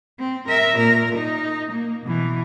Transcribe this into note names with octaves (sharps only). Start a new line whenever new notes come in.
C4
A#4 E5
A#2 A#4
D#4
A#3
B2 E3